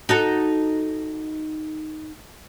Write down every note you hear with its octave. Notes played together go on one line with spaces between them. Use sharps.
D#4 F#4 A4